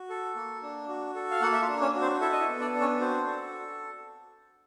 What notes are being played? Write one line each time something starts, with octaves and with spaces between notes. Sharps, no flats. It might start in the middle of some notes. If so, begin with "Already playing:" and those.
Already playing: F#4
A4
A#3
D4
F#4
A4
F5
A#3 F#4 F#5
E5
F4 F5
D4
C#4 C#5
F#4
C4 C5
E4 A4 E5
D#5
E4 E5
B3
D4 D5
D4
C#4 C#5
C4 F#4 C5
A4